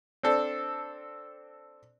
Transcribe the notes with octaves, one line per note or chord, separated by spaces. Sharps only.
C4 D4 A4